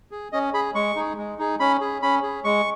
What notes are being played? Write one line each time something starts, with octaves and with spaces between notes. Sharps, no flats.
G#4
C#4 D#5
G#4 B5
G#3 C#6
D#4 G#4
G#3
D#4 G#4
C#4 B5
G#4
C#4 B5
G#4
G#3 C#6